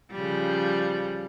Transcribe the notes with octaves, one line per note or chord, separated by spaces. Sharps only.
C#3 F3 G3